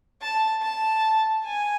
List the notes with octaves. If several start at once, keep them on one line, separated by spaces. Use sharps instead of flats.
A5
A5
G#5